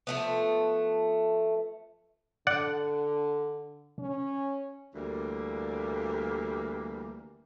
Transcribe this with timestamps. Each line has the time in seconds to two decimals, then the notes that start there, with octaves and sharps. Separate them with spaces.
0.07 F3 A3 B3
2.47 D3 D5 F#5
3.99 C#4
4.95 D2 E3 G3 A#3